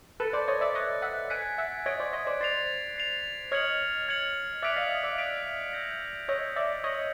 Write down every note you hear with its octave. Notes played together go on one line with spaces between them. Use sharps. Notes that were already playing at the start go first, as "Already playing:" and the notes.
A4 B4 F#6 A6 C#7
C5 D5
C#5 D#5
D5 E5
C#5 D#5 F#6 A6 C#7
E5 F#5
F#5 G#5 G#6 B6 D7
E5 F#5
C#5 D#5 G#6 B6 D7
C5 D5
C#5 D#5
C5 D5
C5 D5 A6 C7 F7
A6 C7 F7
C#5 D#5 F6 G#6 C#7 F#7
F6 G#6 C#7 F#7
D5 E5 D#6 F#6 B6 D7 F7
D#5 F5
D#5 F5
D5 E5
D#6 F#6 B6 D7 F7
E6 G6 A#6
C#5 D#5 E6 G6 A#6
D5 E5
C#5 D#5 D#6 G#6 C#7 F#7